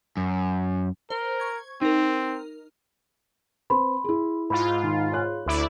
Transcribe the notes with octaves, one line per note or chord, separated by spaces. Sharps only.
F#2
A#4 C5
C#6 G#6
C4 D#4 A#4
C4 B4 B5 C6
E4 G#4
G#2 F4 B5
D#3
C#5 F#6
D2 E4 D5